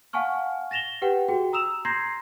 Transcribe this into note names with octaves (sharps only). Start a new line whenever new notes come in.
F5 F#5 G#5 A5 C#6 F6
A6 A#6 E7 F7 G7
G4 B4 F#5 G5
F#4 G#4 G5
A#5 D#6 E6 E7 F7
A#5 C6 G6 G#6 A#6 C7